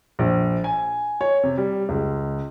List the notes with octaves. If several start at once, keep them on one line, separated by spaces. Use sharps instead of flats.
A#1
G#5
C#5
C3
G3
C#2